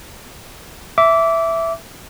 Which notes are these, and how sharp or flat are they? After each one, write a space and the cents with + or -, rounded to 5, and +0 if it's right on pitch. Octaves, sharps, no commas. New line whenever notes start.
E5 +0 D6 -20